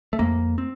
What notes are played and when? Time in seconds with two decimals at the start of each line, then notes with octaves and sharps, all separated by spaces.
0.13 A3
0.19 F2 A#3
0.58 C4